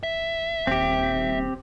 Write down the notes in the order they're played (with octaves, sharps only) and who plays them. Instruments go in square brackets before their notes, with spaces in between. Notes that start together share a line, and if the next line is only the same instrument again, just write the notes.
[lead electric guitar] E5
[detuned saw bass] D#1 [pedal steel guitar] C4 G4